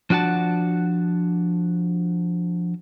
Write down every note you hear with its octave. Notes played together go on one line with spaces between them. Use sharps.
F3 D4 F#4 F#5 A5